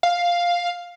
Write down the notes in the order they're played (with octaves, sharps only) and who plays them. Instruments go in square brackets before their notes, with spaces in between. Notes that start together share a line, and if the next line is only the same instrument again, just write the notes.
[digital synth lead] F5